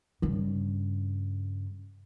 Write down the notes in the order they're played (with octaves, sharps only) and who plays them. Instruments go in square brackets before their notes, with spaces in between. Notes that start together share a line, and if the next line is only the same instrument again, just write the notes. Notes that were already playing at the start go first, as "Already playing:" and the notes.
[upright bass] G2 C#3